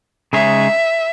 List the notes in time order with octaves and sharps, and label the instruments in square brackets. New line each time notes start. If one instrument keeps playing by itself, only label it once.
[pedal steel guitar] C#3 G#3 D#4 G#4 C#5 [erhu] E5